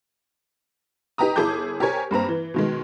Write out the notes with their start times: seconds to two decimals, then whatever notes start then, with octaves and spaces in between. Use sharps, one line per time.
1.18 D#4 G4 B4 A#5 D#6
1.36 G1 E4 G#4 A5 D6 G6
1.80 G4 A#4 C5 C#5 G#5
2.11 G2 A#3 C4 A#5
2.29 E3
2.54 B2 D#3 G#3